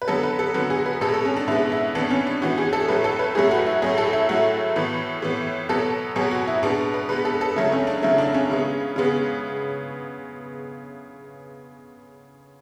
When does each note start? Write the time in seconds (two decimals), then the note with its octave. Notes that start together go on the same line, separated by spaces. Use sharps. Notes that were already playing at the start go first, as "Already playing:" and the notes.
0.02 B4
0.08 D3 F#3 B3 A4
0.23 B4
0.39 A4
0.54 D3 F#3 B3 F#4
0.70 G#4
0.86 B4
1.01 B2 G#3 B3 A4
1.14 A4
1.25 C#4
1.36 D4
1.48 B2 G#3 B3 E4
1.72 E4
1.95 A2 E3 B3 D4
2.10 C#4
2.27 D4
2.42 A2 E3 B3 F#4
2.58 G#4
2.73 A4
2.88 A2 F#3 A3 B4
3.04 A4
3.19 B4
3.35 A2 F#3 A3 G#4
3.51 F#4
3.67 E4
3.82 A2 F#3 A3 G#4
3.98 A4
4.13 E4
4.29 A2 F#3 A3 F#4
4.76 A2 E3 B3
5.22 A2 E3 B3
5.69 B2 F#3 B3 A4
6.16 B2 F#3 B3 G#4
6.31 F#4
6.47 E4
6.63 B2 G#3 B3 D4
6.94 B4
7.09 B2 G#3 B3 B4
7.25 A4
7.41 A4
7.56 C#3 F#3 A3 E4
7.72 C#4
7.87 D4
8.03 C#3 F#3 A3 E4
8.18 D4
8.34 C#4
8.50 C#3 G#3 B3
8.96 C#3 G#3 B3